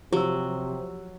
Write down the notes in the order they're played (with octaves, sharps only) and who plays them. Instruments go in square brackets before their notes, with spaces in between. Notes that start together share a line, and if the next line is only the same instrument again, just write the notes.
[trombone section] C3 [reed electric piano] F3 [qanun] F#3 [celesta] G4 E6